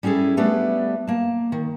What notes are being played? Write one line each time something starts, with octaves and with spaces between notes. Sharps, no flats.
G3 C#4 E4 G#4 A4
G3 A3 B3 D4 D5
A#3 A5
D#3